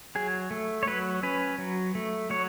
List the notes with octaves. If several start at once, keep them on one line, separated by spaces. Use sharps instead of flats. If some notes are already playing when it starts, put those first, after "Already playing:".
F#3 G#4
A3
C#5
F#3 B4
C#4 B4
F#3
A3
F#3 C#5